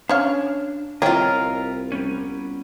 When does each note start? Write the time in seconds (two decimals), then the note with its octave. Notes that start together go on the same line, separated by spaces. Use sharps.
0.09 C#4 D4 C#5 F5
1.02 C2 E4 F4 A#4 C#5 D#5 G5
1.92 G3 B3 C#4